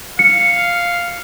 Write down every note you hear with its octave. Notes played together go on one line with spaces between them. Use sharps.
F5 C#7